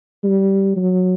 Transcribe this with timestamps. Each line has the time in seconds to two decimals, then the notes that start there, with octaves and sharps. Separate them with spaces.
0.24 G3
0.76 F#3